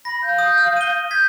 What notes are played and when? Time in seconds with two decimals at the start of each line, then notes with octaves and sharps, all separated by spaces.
0.05 B5 A#6
0.22 F5 G6
0.39 D#6
0.58 F6
0.77 D#7 G7
1.11 G6 G#6 B6